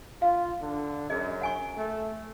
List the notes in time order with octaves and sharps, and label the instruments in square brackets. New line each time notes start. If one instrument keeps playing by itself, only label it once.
[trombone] F4 [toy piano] F5
[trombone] D3
[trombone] F#2 [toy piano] G#4 D#5
[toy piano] F#5 G#5 C#6
[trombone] A3